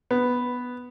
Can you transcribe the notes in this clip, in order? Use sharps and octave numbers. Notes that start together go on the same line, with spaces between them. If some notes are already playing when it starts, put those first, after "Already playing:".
B3